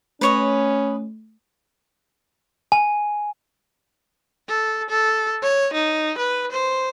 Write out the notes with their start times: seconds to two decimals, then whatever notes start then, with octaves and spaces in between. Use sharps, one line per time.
0.21 A3 C#4 B4 C#5 D#5
2.72 G#5
4.49 A4
4.90 A4
5.42 C#5
5.73 D#4
6.18 B4
6.52 C5